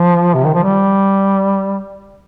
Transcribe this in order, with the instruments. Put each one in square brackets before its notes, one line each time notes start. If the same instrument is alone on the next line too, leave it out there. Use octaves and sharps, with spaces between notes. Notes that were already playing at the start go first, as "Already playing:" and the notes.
Already playing: [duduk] F3
C3
D#3
F3
G3